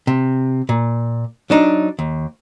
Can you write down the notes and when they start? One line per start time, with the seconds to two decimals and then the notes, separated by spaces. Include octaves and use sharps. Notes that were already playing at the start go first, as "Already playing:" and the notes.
0.07 C3
0.69 A#2
1.50 F#3 D4 D#4
1.99 D#2